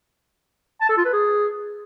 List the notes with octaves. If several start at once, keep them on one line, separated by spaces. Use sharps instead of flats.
A5
A4
F4
B4
G#4